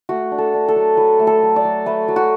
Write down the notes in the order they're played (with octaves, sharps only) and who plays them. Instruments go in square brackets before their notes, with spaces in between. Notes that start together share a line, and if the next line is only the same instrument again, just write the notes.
[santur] A3 F#4
D4
A4
D4
A4
F#3
F#3 B4
A3
A4
F#3
D5
F#3
A3 B4
F#3
F#4